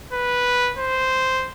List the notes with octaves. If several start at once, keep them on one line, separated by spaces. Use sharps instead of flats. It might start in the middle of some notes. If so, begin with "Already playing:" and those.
B4
C5